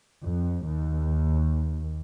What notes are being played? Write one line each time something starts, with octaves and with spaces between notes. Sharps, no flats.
F2
D#2